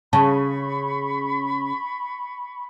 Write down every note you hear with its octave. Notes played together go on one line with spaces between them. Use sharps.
C#3 A5 B5 C#6